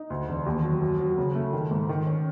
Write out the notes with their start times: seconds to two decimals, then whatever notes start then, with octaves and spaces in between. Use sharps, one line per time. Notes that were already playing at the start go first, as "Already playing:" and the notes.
Already playing: D#4
0.10 D2
0.28 E1
0.46 D#2
0.64 F#3
0.82 F#2
1.00 F#3
1.18 C#3
1.35 A3
1.53 D#3
1.71 G#2
1.89 D#3
2.07 C#4